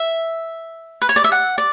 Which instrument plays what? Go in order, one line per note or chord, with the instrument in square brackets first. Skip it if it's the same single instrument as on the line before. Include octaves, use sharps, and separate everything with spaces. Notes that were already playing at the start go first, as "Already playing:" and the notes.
Already playing: [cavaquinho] E5
B4
C#5
D5
E5
F#5
D5